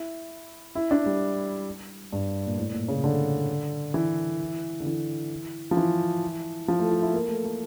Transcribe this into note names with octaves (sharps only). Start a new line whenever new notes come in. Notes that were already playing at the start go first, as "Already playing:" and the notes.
Already playing: E4
E4
D4
G3
G2
A#2
A2
A#2
C#3
D3
E3
D3
E3
F3
E3
F3
A3
F4
E4
A#3
A3
A#3